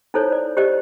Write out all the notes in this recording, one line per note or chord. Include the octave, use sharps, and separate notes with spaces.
D#4 E4 A4 C5 C#5
D5
G4 C5 D5 D#5